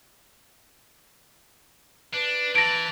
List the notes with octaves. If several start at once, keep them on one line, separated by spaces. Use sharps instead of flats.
D4 B4
E3 A5 A#6 D7